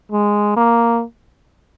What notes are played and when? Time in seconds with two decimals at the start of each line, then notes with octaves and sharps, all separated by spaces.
0.12 G#3
0.56 A#3